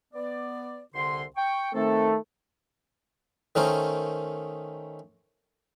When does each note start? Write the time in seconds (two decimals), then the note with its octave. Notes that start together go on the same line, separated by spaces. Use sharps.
0.14 B3 D5
0.94 C2 D3 C6
1.36 G5 C#6
1.74 D#3 A3 C4 A4
3.55 D#3 A3 C#4 D#4 A#4 C5